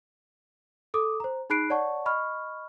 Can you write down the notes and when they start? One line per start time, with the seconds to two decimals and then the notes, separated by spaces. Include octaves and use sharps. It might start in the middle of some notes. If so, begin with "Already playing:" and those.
0.94 A4 D6 D#6
1.20 C5 A#5
1.50 D#4 G#4 B5 F#6 C7 D7
1.70 C#5 D5 F#5 A5 C#6
2.06 D#5 B5 C#6 F6